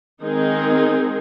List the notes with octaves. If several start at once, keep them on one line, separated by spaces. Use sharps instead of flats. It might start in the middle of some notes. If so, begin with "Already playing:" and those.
D#3 G#3 C4 D#4 G#4